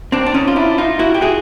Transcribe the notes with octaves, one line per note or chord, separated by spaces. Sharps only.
C4 D4
D4
C#4 D#4
F4
D4 E4
D#4 F4
E4 F#4
G4
F#4 G#4